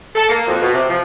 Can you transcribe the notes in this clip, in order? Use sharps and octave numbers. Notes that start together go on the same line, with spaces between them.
A4
A#3
F2
B2
C3
F3